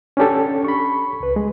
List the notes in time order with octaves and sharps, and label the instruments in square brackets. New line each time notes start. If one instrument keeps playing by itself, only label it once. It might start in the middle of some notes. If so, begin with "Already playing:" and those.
[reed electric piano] C#4 D4 G4 A4
B5 C#6
C#2 B4
G#3